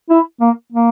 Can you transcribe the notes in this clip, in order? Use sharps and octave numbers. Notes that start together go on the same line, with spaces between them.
E4
A#3
A#3